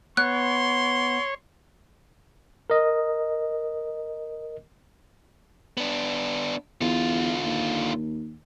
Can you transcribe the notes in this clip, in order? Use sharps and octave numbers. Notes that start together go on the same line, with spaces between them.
B3 C#5 C6 F#6
A#4 D#5
B3 D4
E2 D3 F4
D#2